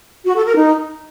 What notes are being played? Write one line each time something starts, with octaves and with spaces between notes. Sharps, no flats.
F#4
A4
A#4
D#4